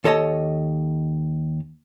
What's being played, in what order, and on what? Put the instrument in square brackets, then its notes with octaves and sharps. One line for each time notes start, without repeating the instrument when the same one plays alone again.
[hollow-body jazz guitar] D#2 A4 C#5 D#5 A5